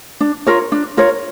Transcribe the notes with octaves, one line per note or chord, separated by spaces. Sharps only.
D4
F4 A#4 C#5
D4
F4 A#4 C#5